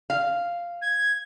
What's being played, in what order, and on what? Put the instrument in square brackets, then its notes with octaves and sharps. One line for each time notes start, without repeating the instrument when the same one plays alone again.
[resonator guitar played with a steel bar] F5
[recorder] G#6